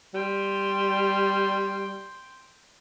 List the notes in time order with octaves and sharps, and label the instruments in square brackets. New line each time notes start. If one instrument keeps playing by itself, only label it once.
[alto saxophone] G3 [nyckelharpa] G5 C6